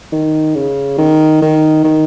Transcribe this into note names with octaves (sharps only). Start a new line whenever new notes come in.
D#3
C#3
D#3
D#3
D#3